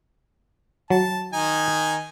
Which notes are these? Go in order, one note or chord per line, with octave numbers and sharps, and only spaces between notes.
F#3 A5
D#3 D#4 G#5